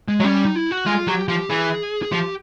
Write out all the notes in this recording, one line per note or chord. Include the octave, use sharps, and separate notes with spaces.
G#3
F#3
G3 C#4
D#4
E4
F#4
G#3 F4
F#3 G4
F3 G4
E3 G#4
G#4
F3 G4